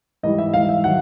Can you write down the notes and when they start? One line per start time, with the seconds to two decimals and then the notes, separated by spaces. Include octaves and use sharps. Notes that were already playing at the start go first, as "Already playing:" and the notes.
0.23 G#2 E3 G3 D#5
0.38 E5
0.54 G#2 E3 G3 F5
0.69 E5
0.84 D#3 F#3 F#5